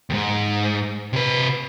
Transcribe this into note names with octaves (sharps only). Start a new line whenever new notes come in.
D#2 G#2
C3 B4